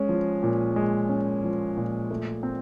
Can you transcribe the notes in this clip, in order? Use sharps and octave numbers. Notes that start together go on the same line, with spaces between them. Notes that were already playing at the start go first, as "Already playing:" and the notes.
Already playing: G#3 C#4
F3
A#2
G#3
C#4
F3
A#2
A3
C4